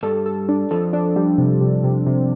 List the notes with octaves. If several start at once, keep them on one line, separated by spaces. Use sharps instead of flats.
G2 G3 A4
A4
D4
F2 F3 A4
D4
G3
C3
C3
C3
C3